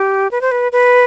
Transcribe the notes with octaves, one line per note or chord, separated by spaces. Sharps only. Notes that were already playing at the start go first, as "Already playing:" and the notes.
Already playing: G4
B4
C5
B4
B4